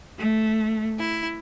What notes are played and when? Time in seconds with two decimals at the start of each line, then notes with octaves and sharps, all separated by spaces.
0.18 A3
0.98 E4